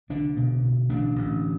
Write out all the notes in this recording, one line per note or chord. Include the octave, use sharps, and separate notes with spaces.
C2 D3 D4
B2
B2
A1 D3 D4
A1